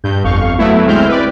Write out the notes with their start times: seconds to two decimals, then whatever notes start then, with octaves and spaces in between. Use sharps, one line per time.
0.04 G2 G6
0.24 G1 F2 F5 C#6
0.58 F#3 A3 B3 E4
0.86 D2 G#3 C4 E4 F6 G6
1.08 B4 D5